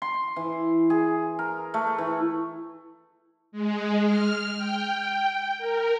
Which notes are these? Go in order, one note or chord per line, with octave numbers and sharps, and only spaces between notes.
C6
E3
G#4
A#4
A3
E3
G#3
F6
G5
A#4